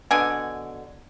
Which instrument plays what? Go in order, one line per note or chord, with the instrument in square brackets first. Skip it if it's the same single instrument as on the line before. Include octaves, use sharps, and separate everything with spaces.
[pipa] B2 D3 G#5